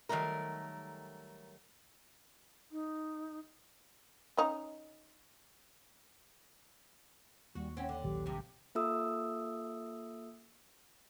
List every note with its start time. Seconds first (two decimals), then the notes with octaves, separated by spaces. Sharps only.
0.09 D#3 F#3 G3 A3 A#4
2.72 D#4
4.37 C#4 D#4
7.55 D#2 G3 F#4
7.77 C4 C#4 F#5
7.89 D3
8.03 A#1 D#3 F#3 G4
8.26 G2 C3
8.75 A#3 F4 A4 E5 D#6 E6